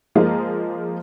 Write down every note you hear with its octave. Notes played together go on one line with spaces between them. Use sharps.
F3 G#3 A#3 F4 G#4